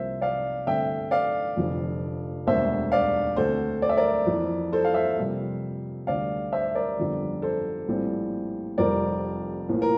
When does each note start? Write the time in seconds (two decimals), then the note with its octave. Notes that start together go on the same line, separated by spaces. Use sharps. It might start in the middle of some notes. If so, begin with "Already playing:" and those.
Already playing: C2 C3 F3 A#3 C5 E5
0.21 D5 F5
0.67 G2 D3 A3 C4 E5 G5
1.11 D5 F5
1.57 F1 F2 D3
2.46 E1 D2 D3 G3 A#3 C5 E5
2.92 D5 F5
3.36 D2 D3 A3 C4 A4 C5
3.82 D5
3.89 E5
3.97 A#4 D5
4.27 F2 E3 A#3
4.72 A4 C5
4.85 F5
4.94 C5 E5
5.18 F2 C3 G3 A#3
6.07 D2 D3 G3 D5 F5
6.52 C5 E5
6.75 A#4 D5
6.98 G1 F2 D3 G3
7.42 A4 C5
7.88 A#1 A2 G3 C4
8.78 F1 F2 C3 G3 C4 A#4 D5
9.69 A#1 A2 F3 A#3
9.82 A#4